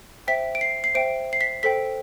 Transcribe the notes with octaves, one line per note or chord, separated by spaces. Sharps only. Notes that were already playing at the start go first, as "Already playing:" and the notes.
C5 E5 G5 B6
D7
C7
C7
C5 E5 G5 D7
C7
B6
A4 C5 G5 B6